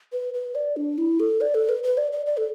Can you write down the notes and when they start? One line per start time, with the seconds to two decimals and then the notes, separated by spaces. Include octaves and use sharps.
0.12 B4
0.34 B4
0.55 D5
0.76 D4
0.98 E4
1.20 A4
1.41 D5
1.55 A4
1.69 B4
1.83 B4
1.97 D5
2.12 D5
2.26 D5
2.37 A4